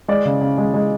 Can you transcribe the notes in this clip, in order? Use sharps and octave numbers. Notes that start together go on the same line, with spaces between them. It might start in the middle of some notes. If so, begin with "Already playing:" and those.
G#3 D5
C#3
C#3
G#3
G#3